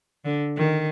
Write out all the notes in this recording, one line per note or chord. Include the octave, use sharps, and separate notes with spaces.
D3
D#3